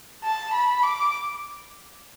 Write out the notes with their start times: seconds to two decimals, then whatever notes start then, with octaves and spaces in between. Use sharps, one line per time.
0.23 A5
0.53 B5
0.83 D6